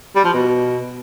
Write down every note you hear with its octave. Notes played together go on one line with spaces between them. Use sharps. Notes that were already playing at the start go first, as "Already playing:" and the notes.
G3
F3
B2